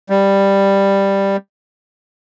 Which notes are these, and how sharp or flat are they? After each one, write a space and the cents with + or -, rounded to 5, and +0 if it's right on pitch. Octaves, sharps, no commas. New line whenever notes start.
G3 +5